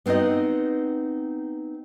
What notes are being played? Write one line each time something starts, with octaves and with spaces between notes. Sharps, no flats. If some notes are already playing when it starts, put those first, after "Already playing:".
B3 C4 D#4 F#4 D#5